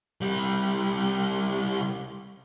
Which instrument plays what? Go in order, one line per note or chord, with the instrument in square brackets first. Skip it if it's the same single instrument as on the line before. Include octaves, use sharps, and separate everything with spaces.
[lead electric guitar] C2 G3